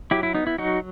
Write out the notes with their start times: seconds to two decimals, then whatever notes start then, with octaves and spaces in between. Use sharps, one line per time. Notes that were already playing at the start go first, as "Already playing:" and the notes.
0.11 F#3 E4 G4
0.23 E4
0.35 B3 D#4
0.47 E4
0.58 F#3 D#4 F#4